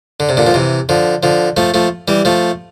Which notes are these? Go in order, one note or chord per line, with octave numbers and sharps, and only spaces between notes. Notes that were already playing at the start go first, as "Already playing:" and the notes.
D3
C3
A#2 D3
F3
C3 E3
D3 F3
D3 F3
F3 A3
F3 A3
E3 G3
F3 A3